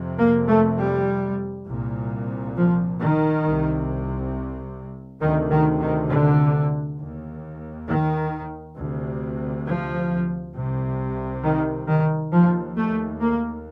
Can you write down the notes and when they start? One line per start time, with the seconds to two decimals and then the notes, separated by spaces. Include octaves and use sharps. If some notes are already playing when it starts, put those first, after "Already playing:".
Already playing: F2 C3
0.18 A#3
0.48 A3
0.78 G3
1.67 C2 A#2
2.56 F3
3.00 D#3
3.44 C2 C3
5.21 D2 C3 D#3
5.51 D#3
5.80 D#3
6.10 D3
6.99 D#2
7.88 D#3
8.76 D2 C3
9.66 F3
10.54 C2 C3
11.43 D#3
11.87 D#3
12.32 D#2 F3
12.77 A3
13.21 A#3